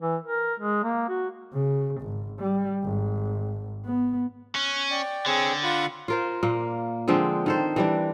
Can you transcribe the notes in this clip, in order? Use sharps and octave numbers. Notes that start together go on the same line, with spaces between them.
E3
A#4
G#3
A#3
F#4
C#3
G#1
G3
G#1
B3
C#4 F#6
D5 G5
D3 C4 G#4 C#5
F4 F#5 B5
F4 A#4 C5
A#2 A#3
D3 F3 G#3 C4
D#3 A4 C5
E3 G3 D4